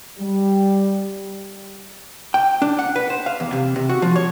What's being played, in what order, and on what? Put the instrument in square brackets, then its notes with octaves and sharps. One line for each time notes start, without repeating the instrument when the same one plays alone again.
[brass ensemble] G3
[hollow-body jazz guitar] G5
D4
F#5
B4
C5
F5
E2
C3
C3
F#4
F3
C#5